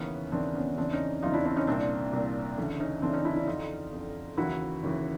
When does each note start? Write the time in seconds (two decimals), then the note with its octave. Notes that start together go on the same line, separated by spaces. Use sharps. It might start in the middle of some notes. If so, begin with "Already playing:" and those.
Already playing: D#2 C#3 E3 B3 C#4
0.32 D#2 C#3 E3 C4 D4
0.56 B3 C#4
0.77 E2 C#3 E3 C4 D4
0.93 C#4 D#4
1.22 E2 C#3 E3 D#4 F4
1.33 D4 E4
1.45 C4 D4
1.56 C#4 D#4
1.67 C2 A#2 C4 D4
2.13 C2 A#2
2.58 D2 C#3 E3
2.80 C#4 D#4
3.02 D2 C#3 E3 C4 D4
3.13 C#4 D#4
3.25 D4 E4
3.36 D4 E4
3.47 F2 D3 D#4 F4
3.92 F2 D3
4.37 D#2 C#3 E3 E4 F#4
4.83 D#2 C#3 E3